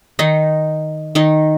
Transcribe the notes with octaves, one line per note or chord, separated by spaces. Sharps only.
D#3 D#4
D#3 D#4